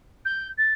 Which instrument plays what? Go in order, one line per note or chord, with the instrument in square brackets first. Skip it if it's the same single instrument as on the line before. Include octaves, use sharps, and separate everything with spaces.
[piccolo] G6
A6